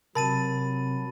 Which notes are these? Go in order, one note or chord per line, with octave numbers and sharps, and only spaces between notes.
C3 F#3 A#4 A5 B5 A6 D#7